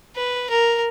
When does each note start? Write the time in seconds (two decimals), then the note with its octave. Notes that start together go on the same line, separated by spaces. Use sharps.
0.16 B4
0.50 A#4